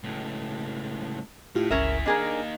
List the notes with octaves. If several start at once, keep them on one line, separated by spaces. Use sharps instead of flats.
C#2 A2
A2 E4 F4 G4
G1 C#2 C#4 E4 G#4 A#4 E5
A#3 D4 D#4 G#4 A#4 D#5 G#5